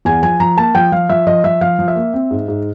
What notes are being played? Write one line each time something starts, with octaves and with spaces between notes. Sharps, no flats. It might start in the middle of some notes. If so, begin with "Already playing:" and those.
E2 G#5
F3 G#5
F3 A#5
A#3 A5
F3 G5
F3 F5
F3 E5
F3 D#5
F3 E5
F3 F5
F3
E5
A#3
C4
G#2
G#2